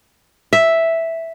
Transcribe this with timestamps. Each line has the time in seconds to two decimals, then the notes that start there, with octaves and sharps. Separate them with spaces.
0.53 E5